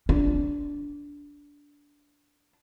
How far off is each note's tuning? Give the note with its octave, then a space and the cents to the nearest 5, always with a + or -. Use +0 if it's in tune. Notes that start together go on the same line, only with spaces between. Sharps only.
D4 -15